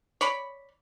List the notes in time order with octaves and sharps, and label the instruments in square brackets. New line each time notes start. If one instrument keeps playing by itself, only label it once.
[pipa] C#5 D5 B5